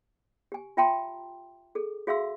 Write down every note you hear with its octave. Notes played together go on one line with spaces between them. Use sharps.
G4 G#5
F4 E5 G5 A5 A#5 C6
G#4 A4
F#4 G#4 E5 F5 C6 E6